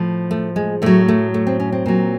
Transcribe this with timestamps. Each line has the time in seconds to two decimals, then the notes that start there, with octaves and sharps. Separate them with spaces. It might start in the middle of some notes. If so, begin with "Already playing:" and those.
Already playing: A2 F3
0.31 A3
0.56 G#3
0.82 A2 F#3 A3
1.08 A3
1.34 A3
1.47 C4
1.60 C#4
1.72 C4
1.86 A#2 F#3